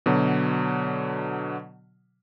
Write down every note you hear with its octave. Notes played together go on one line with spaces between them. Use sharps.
B2 D3 F#3